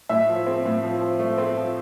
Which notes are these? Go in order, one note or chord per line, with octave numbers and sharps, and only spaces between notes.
A2 E5
F3
C4
A2
F3
F3
A3
C4
F3